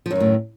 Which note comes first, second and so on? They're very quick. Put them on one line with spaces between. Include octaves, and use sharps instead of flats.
F3 F#2 D#3 A2